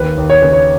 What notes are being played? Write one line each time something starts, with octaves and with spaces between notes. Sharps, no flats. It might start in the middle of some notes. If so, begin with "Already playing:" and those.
Already playing: D#2 B4
D#2
C#5
C#3 B4
C#5